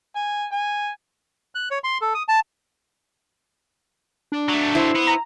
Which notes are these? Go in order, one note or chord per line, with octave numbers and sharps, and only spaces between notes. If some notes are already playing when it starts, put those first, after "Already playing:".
G#5
G#5
F#6
C#5
C6
A4
D#6
A5
D4
F#3 A3
E4 C5
B3
A#5